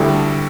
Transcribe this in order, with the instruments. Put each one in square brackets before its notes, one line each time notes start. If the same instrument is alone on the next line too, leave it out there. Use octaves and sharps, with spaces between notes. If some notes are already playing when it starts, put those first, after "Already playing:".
Already playing: [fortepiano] D2 D3 G3 E4